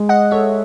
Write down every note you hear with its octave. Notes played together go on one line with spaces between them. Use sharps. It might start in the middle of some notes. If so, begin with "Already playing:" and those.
Already playing: G#3
D#5 F#5
A4 C#5 E5